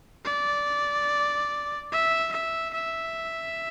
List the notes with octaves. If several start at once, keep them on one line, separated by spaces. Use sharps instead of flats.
D5
E5
E5
E5